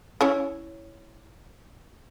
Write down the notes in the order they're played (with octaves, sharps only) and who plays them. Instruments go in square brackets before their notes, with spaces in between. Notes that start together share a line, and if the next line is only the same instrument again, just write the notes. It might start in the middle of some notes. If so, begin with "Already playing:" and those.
[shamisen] C#4 E4 C#5